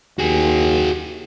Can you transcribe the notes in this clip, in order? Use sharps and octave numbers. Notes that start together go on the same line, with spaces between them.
D#2 F#4 G#4